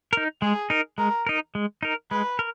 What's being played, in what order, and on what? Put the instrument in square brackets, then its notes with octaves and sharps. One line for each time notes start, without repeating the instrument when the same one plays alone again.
[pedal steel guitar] D#4 A#4
[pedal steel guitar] G#3 [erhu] G#4
[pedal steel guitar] D#4 A#4
[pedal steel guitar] G#3 [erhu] A#4
[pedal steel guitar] D#4 A#4
G#3
D#4 A#4
[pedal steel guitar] G#3 [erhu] B4
[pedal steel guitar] A#4